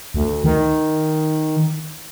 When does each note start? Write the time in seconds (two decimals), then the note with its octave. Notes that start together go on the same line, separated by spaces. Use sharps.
0.14 D2
0.44 D#3